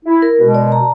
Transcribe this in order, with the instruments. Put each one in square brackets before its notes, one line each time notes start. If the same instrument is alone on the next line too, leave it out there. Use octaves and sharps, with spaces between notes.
[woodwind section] E4
[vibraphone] A#4
[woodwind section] B2 G#3
[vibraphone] D5
A5 A#5